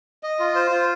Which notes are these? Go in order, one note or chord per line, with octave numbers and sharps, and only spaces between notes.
D#5
F4
C5
F4